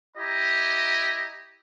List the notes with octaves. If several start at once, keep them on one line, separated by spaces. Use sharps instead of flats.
E4 G4 D#5 A#5